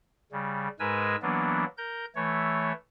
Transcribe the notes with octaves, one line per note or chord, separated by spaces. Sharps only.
C#3 G3
G#2 G#3 A#4 B4 G#5 E6
E3 F#3 A#3 B3 D4
A#4 G6
E3 A3 C#5